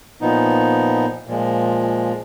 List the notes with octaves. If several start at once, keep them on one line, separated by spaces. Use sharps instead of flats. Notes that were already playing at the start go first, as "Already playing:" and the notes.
A#2 F3 B3 D#4
A#2 F3 G#3